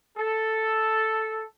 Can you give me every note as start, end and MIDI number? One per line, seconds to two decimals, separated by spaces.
0.17 1.44 69